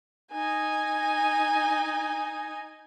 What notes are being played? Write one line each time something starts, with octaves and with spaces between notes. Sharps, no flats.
D#4 G#5